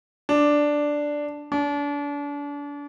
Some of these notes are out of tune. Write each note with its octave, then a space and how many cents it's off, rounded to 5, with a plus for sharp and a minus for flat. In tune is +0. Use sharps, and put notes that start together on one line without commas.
D4 +0
D4 -35